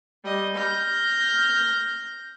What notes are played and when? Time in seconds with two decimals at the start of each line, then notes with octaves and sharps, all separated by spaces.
0.25 G3 D#5
0.55 F6 G6 A#6